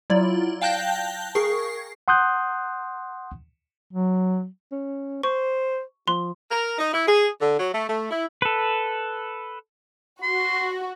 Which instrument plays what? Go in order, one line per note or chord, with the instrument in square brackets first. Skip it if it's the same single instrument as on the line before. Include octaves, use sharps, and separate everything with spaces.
[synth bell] F#3 E4 F4 D5
F5 G5 A5 F#6 G6 A#6
G#4 A#4 C#6 C7
[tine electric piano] F#5 C6 D#6 F#6 G6
[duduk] F#3
[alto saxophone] C#4
[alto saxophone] C5 [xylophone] C#6
[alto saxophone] F3 [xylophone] C6
[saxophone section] A#4
D#4
E4
G#4
D3
F#3
A3
A3
E4
[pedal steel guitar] A4 B4
[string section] F#4 [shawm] C6